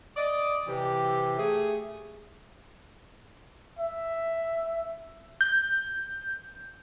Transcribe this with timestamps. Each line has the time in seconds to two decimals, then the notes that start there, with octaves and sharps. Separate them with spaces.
0.16 D5 D#5
0.68 C3 E3 G4
1.38 A3 G#4
3.79 E5
5.41 G6